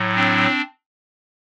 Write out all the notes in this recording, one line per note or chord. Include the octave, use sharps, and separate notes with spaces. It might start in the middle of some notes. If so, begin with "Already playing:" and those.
Already playing: A2 F#3
C4 D4